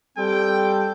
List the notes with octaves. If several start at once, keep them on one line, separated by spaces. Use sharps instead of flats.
G3 C4 A4 G5